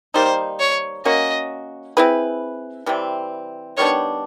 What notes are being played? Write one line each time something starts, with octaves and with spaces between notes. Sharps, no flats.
D#3 G3 A#3 D#4 C5
C#5
A#3 C#4 F#4 D#5
C4 E4 G#4 B4
C3 E3 G3 C4
D#3 G3 B3 D4 C#5